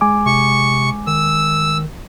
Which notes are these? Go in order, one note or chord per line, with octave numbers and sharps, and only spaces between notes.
G#3 G#5 D6
C3 C#6
D#3 E6